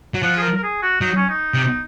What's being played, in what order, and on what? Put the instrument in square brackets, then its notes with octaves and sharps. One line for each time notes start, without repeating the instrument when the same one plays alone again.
[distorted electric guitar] F#3
[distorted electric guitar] F3 [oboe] F#5
[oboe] G#4
A#4
A#4
G#4
F#4
[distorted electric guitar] F#3 [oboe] D#4
[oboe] C#4
D#4
[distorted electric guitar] C3